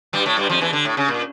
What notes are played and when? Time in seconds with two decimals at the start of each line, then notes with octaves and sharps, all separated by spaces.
0.13 G2 G3
0.26 A2 A3
0.37 G2 G3
0.49 F2 F3
0.61 E2 E3
0.73 D3
0.85 A2
0.97 C#3
1.08 A#2